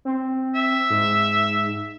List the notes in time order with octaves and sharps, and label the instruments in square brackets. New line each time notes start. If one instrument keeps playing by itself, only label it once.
[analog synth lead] C4
[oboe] E5
[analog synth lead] G#2